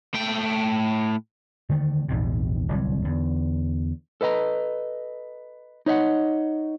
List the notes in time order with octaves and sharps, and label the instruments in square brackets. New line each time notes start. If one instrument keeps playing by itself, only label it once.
[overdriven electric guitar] A2 G5
[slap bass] D3 D#3 A3
A#1 E2 G#2 C3
D1 C2 F#3
E2 D3
[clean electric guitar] A4 B4 D#5 G5 A#5
D#4 C#5 D#5 E5 F#5